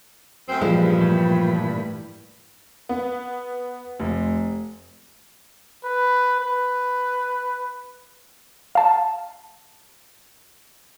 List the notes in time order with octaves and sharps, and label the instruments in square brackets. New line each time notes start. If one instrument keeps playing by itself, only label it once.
[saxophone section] F#2 A3 C4
[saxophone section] G2 [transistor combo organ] A#2 E3 B5 [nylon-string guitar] F3 [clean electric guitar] G#3
[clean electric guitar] A2
[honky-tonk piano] B3
F1
[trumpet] B4
B4
[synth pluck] F5 A5